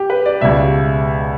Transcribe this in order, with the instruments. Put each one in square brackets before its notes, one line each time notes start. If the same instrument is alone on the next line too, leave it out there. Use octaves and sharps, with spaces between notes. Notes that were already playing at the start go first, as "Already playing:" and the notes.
Already playing: [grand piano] G4
B4
D5
C#2 B2 G3 E5